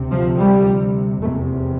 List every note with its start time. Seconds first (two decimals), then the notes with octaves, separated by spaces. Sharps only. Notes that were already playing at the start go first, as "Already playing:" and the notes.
Already playing: D2 C3
0.10 F3
0.38 G3
1.22 F1 E2 C3 A3